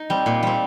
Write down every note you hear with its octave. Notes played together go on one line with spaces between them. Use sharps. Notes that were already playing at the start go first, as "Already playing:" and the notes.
Already playing: D#4
G3 C4
A#2
G3 C4